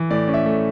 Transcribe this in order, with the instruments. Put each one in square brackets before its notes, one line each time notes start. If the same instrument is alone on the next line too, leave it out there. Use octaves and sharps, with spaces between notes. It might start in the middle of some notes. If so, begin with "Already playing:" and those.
Already playing: [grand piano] E3
A2 D5
C#4
E5
A3